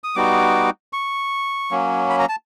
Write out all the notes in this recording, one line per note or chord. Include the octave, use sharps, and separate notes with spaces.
D#6
G3 B3 D#4 F#4 D6
C#6
F#3 A#3 C#4
B5
A#5
A5